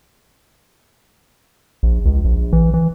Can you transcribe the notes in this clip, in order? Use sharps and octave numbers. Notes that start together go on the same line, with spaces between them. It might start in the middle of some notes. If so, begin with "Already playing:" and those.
A#1
C#2
A#1
E3
E3